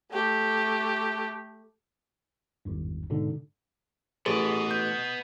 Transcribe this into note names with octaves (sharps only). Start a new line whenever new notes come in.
A3 G4
G#1 E2 G2
G#2 B2 D3
A1 B3 G#4 D#5
G6